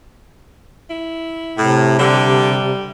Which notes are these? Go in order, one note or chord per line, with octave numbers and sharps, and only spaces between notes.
E4
A2 C3
D3 G3